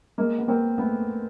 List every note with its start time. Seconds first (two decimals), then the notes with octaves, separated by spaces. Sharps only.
0.18 G#3 A#3
0.38 B3
0.48 A#3 C4
0.78 A3 B3